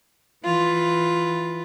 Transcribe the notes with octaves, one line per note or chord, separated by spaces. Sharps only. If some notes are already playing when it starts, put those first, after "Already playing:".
E3 F4